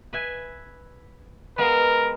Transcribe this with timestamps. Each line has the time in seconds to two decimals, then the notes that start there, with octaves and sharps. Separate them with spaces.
0.13 B4 E5 G#5
1.58 G#3 B3 A#4 F5